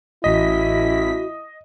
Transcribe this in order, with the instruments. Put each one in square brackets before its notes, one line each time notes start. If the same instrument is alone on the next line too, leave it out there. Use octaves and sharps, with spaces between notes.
[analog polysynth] A1 B6 [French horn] E4 [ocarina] F#4 [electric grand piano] D#5